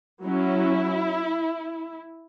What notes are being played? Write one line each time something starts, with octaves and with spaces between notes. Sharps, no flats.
F#3 C#4 E4